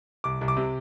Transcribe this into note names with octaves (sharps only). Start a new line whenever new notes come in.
C2 D6
C2
D6
C3